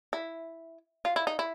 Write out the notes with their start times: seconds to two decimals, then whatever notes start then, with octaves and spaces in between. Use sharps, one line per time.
0.13 E4
1.05 F4
1.16 E4
1.27 D#4
1.39 E4